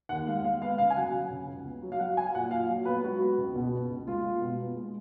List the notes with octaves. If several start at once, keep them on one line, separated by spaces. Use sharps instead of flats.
D#2 F#5
G#3 F5
G#3 F5
B3 F5
C#3 F5
G#5
F#3 F#5
C#3
C#3
C#2
B3
F#3
F5
F#3 F#5
F#3 G#5
A#2 F#5
A#2 F5
F#3
B3 B4
G#3 F#4
B3
C#2
B2
B3
C#2
G#3 F4
G#3
B2
B3
G#3